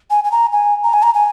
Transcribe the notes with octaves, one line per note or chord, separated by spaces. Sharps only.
G#5
G#5
A#5
G#5
A#5
G#5
A#5
G#5